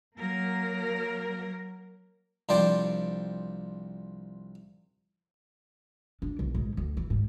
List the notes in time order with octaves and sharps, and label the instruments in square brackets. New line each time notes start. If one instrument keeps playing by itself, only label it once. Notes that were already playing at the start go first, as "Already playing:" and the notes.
[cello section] F#3 A#3 A#4
[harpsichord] C2 F3 D4 C5 D5 G5
[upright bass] D4
B1
G#2
D2
E3
G#2